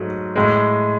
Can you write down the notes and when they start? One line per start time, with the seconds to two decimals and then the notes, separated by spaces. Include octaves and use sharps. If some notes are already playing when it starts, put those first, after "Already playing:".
Already playing: G#2 F#3 A3
0.36 A2 G#3